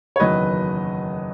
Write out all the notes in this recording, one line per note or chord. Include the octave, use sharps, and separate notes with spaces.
C#5
F#1 E2 D#3 F#3 B4 D#5